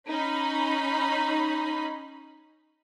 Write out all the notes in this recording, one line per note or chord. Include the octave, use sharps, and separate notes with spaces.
C#4 D#4 B5